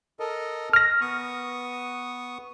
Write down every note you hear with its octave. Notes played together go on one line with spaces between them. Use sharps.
A4 A#4 D#5
F6 A#6
B3 C#6 D#6